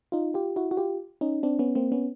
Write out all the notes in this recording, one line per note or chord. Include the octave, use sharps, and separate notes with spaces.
D#4 F4
F4 G4
E4 F#4
F#4
F4 G4
C#4 D#4
C4 D4
B3 C#4
A#3 C4
B3 C#4